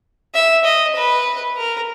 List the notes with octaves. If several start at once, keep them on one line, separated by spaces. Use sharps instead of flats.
E5
D#5
B4
A#4